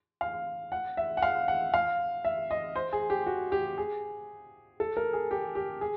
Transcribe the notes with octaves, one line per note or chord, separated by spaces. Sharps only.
F5
F#5
E5
F#5
F5
F#5
F5
E5
D#5
C5
G#4
G4
F#4
G4
G#4
A4
A#4
G#4
G4
G4
G#4